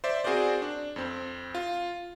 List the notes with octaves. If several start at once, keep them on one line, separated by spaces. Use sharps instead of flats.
C5 D5 E5
C4 F#4 G#4 A#4 C5 D5
D4
F2 C4
F4